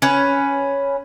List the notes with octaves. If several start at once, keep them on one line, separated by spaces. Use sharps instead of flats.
C#4 B4